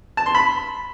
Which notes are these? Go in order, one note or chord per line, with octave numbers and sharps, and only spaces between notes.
A5
C6
B5